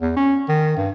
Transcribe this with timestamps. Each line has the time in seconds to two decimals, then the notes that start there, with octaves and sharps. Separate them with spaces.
0.01 E2
0.16 C#4
0.49 D#3
0.76 G2